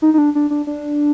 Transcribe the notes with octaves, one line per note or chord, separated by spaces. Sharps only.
D#4
D#4
D4
D4
D4
D4